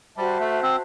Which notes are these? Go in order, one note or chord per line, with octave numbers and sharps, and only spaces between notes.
G3 F#4 C5 E5 A5
A3
C4